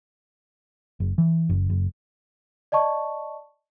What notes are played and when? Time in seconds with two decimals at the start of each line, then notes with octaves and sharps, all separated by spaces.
1.00 F#1
1.18 E3
1.49 F#1
1.70 F#1
2.72 D5 D#5 A5 C#6